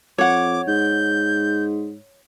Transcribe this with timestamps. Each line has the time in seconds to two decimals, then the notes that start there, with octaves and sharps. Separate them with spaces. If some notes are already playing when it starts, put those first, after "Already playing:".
0.18 F2 C#5 F#5 D6
0.67 G#2 G6